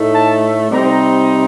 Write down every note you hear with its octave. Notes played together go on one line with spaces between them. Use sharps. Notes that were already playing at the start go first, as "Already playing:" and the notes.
Already playing: A2 A3 D#4
A5
C3 G3 C4 D#4 A#5